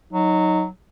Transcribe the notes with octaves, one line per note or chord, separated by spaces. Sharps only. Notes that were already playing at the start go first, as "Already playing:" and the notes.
F#3 D#4